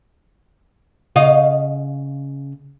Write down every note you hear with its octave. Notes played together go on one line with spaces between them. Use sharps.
C#3 D#5 F5